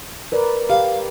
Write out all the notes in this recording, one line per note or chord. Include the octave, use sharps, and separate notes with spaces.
A#4 B4 D5
G4 F5